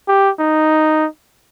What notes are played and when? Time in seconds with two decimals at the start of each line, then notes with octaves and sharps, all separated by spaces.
0.08 G4
0.40 D#4